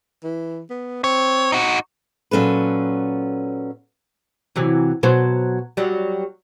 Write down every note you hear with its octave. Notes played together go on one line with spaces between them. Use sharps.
E3
B3
C4 C#5
D#4 F#4
A#2 F#3 C#4 A4 B4
C3 E3 F#3
B2 F#3 C5
F#3 G3